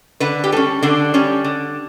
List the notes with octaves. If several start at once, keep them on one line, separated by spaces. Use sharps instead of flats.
D3 B4
G4
G3 C#4 A4
D3 D4
G3 C#4
D3